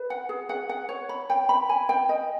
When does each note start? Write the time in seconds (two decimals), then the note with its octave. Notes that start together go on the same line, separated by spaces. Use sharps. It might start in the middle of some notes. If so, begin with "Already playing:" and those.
Already playing: B4
0.10 F#5
0.29 G#4
0.49 F#5
0.69 F#5
0.89 C#5
1.09 B5
1.30 G5
1.49 B5
1.69 G#5
1.89 G5
2.09 D#5